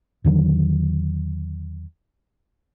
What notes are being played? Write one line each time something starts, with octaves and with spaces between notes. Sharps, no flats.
E2 D3 D#3 F#3